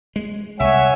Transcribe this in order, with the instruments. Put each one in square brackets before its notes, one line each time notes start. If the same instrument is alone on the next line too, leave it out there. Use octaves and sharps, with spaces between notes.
[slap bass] G#3
[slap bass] C2 [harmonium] C#5 G#5 [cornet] E5 [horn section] F#5